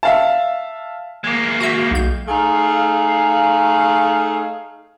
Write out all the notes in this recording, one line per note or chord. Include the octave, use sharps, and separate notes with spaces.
E5 F5 A5
G#3 A#3
F#4 E5
B1 G6
A3 D#4 G#4 F5